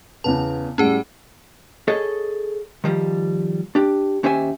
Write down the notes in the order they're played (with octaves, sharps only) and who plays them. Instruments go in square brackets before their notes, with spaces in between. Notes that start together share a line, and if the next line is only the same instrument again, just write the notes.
[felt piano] E2 C#3 B3 [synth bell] A5
[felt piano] A2 G3 [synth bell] C#4 G#4 F#5
[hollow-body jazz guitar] G#4 A4 C#5 D#5
D#3 F3 G3
D4 G4
D#2 C#4 G4 C5 E5 G#5